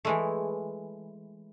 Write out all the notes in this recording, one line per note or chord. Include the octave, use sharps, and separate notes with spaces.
E3 G#3 A3